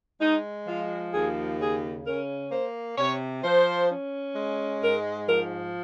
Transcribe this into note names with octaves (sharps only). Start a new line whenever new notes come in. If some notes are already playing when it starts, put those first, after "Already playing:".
G#3 D#4
F3 F4
D#2 G#4
C#3 G#4
C#4 A#4
A#3 C5
C3 C#5
F3 C5
C#4
G#3
G#2 A#4
F3 A#4